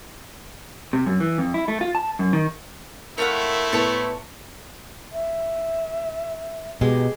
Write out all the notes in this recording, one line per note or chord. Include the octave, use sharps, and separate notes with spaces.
C3
F#2
E3
F2
E4
A3
F4
A5
F#2
D#3
A3 C4 E4 A#4 C#5 F5 F#5
A2 B3 A4 C#5 A5
E5
B2 G#3 G4